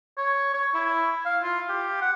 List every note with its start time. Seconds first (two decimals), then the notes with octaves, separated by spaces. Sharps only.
0.18 C#5
0.54 C#5
0.75 E4
1.25 F5
1.43 F4
1.69 G4
2.01 F#5